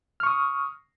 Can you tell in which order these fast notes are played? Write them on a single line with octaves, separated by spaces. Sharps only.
F6 C#6 D#6